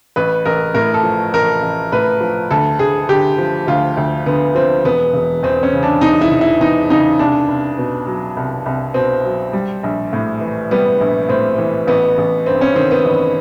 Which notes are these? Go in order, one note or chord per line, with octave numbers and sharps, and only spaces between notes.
A1 B4
A1 A#4
A2 A#4
A4
F3
A1 A#4
A1
A2 B4
F3
D2 A4
D2 G#4
D3 G4
F3
D2 F4
D2
D3 B3
F3 C4
E1 B3
E1
E2 C4
C#4
C#3
D4
E1 D#4
E4
E1
E4
E2 D#4
C#3 D#4
C2 D4
C2
B2
F#3
C2
C2
B2 C4
F#3
G3
A#1
A2
E3
G3 B3
A#1
A2 C4
E3
A1 B3
A1
G2 C4
C#4
D#3 C4
B3
A1